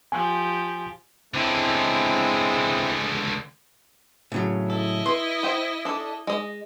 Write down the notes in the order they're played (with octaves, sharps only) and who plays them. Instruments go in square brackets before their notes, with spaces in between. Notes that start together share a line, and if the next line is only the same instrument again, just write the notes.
[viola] F3 G4 [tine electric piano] G#5
[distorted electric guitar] C#2 D3 [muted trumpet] G#3 [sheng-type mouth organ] C4 E4
[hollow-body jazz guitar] A2 C#3 F#3
[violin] E4 D#5 [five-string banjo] A4
[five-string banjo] B4 [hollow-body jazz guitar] C6
[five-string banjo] C5 G5
D4 A4
G#3 D#5